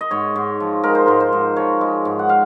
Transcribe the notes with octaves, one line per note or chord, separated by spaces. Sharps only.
D#5
G#2 C#5
G#2
F3
G#3 A#4
C5
G#2 A#4
C5
G#2
F3 C#5
G#3
G#2
F#5
F5